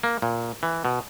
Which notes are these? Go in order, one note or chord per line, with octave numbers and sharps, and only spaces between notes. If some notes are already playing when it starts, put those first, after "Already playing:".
A#3
A#2
E3
B2